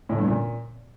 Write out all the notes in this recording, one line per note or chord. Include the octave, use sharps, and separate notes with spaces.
A2
G2
A#2